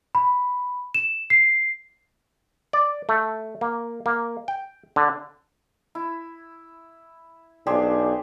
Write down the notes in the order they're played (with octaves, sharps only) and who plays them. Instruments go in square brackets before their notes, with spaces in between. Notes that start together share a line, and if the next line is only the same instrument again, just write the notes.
[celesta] B5
E7
C7
[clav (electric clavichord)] D5
A3
A#3
A#3
G5
D3
[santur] E4
[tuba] B1 [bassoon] D4 [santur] G4 G#4 C5